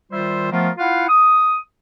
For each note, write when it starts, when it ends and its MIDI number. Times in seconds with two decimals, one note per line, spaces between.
0.11 0.50 51
0.11 0.50 55
0.11 0.50 65
0.11 0.50 72
0.11 0.50 76
0.52 0.69 53
0.52 0.69 57
0.52 0.69 59
0.52 0.69 65
0.52 0.69 70
0.78 1.06 64
0.78 1.06 65
0.78 1.06 77
0.78 1.06 78
1.09 1.57 87